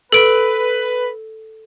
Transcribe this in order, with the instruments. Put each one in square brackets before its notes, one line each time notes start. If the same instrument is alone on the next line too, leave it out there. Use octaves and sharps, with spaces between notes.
[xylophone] A4 D7 [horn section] B4